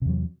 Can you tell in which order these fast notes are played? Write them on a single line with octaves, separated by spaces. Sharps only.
C3 E2 F#3